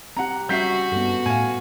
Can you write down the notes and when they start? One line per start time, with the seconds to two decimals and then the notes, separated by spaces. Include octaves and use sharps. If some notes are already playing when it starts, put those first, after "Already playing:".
0.17 C4 G4 F#5 A#5
0.49 G3 C#4 F#4 E5 G6 B6 C7
0.92 G2 B3 A4
1.26 A2 F5 G#5